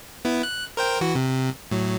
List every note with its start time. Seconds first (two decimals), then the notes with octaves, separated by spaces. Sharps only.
0.25 B3 E4
0.43 F#6
0.77 A#4 C5 G5
1.01 E3 F#4
1.15 C3
1.71 A2 F#3